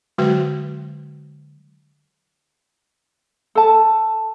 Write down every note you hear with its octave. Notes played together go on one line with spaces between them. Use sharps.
D3 F#3 G#3 F#4 B4
A4 A5